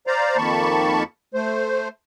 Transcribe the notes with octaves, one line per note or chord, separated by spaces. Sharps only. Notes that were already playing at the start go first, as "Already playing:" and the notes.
C5 D5 F5 A#5
F2 D#3 A#3 A5 B5 C#6
A3 C5